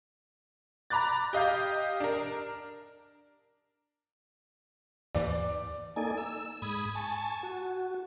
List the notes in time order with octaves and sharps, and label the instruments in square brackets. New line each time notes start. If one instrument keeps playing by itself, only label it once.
[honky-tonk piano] A#5 B5 D6 F#6 A6
G4 D#5 F5 G6
D4 A#4
[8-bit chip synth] D#2 G#2 E3 [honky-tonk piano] D5
[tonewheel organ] A#3 D#4 A4 D5 G#5
E6
G#2 B5 D#6 G#6
G#5 A5 C#6
F#4